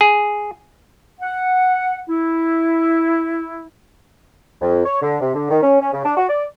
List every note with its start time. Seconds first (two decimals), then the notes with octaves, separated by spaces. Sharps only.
0.01 G#4
1.22 F#5
2.09 E4
4.61 F2
4.85 C#5
5.02 D3
5.21 C3
5.35 D3
5.50 D#3
5.63 C#4
5.80 C#4
5.93 C#3
6.05 D4
6.17 F#4
6.29 D5